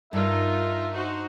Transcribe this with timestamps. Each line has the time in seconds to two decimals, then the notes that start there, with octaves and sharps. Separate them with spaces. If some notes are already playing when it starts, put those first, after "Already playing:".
0.13 G2 D#4 F4 A#4 E5
0.92 D#4 F#4 C5